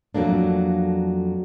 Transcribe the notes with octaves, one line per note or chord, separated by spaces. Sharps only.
F2 F#3 A3 A#3 D4